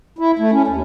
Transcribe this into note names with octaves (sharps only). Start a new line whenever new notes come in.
E4
A3
C#4
D#2